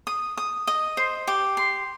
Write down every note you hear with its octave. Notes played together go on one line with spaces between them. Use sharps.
D#6
D#6
D#5
C5
G4
C6